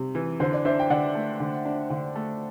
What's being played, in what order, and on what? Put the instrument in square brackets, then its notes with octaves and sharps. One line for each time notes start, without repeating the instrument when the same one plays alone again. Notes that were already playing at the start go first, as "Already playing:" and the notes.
Already playing: [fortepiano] C3 G3
E3
[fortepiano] D3 [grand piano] C5
[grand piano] D5
[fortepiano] D4 [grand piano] C5 E5
[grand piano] G5
[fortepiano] D3 [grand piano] D5 F#5
[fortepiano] A3
D3
D4
D3
A3